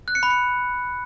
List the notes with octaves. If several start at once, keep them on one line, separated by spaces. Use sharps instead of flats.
F#6
C#7
B5
C#7